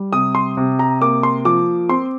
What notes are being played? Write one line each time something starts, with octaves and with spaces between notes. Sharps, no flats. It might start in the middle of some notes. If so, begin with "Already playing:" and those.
Already playing: G3
C3 D#6
C6
C3
A#5
A#3 D6
C6
F3 D6
C4 C6